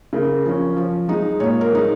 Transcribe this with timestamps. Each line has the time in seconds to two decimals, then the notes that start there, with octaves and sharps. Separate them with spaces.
0.13 C#3 A#4
0.45 F3 C#4
0.77 F3
1.08 G#3 D#4
1.40 A#2 C#5
1.61 A#4
1.72 G#3 D#4